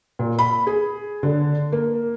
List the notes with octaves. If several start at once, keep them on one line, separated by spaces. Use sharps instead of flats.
A#2
B5
G#4
D3
A#3